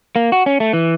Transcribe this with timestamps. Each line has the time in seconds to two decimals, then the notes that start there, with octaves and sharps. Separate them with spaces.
0.16 A#3
0.32 F#4
0.46 C#4
0.60 A3
0.73 E3